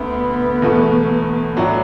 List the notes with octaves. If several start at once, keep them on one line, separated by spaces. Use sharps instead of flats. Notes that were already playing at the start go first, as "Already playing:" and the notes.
Already playing: D2 D3 A3 B3
E2 B2 A3 F#4
A2 F#3 D4 F#4